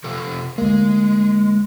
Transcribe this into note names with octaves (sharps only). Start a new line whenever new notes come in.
C3 F3 A4
D2 G#3 A#3